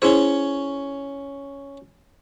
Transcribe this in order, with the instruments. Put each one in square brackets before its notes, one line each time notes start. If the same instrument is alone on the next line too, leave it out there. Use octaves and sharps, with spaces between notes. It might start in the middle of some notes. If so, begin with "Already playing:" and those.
[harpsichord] C#4 C#5 [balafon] E4 G#4 C5